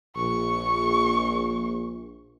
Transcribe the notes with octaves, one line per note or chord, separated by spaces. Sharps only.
A#1 C#6